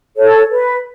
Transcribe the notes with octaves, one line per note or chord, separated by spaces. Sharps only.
A4 C#5
B4